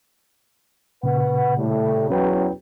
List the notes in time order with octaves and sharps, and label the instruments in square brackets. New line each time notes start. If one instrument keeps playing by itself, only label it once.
[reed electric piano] A#2 C#3 [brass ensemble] B4 F#5
[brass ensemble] A2 G3 A3
[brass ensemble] E2 F#3 [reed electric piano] C#4 B4 G5